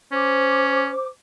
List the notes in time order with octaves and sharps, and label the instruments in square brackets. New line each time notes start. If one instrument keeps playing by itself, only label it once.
[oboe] C#4 [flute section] C5 D6